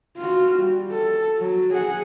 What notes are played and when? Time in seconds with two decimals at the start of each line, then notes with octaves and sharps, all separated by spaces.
0.17 F4 F#4
0.59 G3
0.92 A4
1.38 F#3
1.74 G#4 F#5